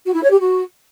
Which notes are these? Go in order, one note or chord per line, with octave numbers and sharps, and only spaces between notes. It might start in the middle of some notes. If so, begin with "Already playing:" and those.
F#4
E4
C#5
G4
F#4